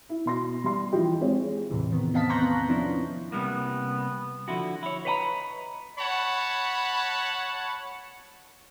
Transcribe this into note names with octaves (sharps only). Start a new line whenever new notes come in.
E4
B2 C6 A#6
G3 C6
E3 F3 G4 D#5
G#3 C4 C5 C#5
E2 A2 C3 E3
D#3 B3
B3 C4 D#5 F5 A5 B6
A#5 C6 C#6 F#6 G6 A#6
B3
F3 B3 C#4 D4 E4
C3 G3 A#3 B3
D3 F3 E4 F#4
E4 C#5
B4 C#5 D#5 F#5 A#5 B5
C#5 F#5 A5 B5